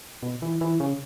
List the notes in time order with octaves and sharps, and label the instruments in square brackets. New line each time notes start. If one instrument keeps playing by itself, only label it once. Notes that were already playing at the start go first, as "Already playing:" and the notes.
[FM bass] B2
E3
E3
C#3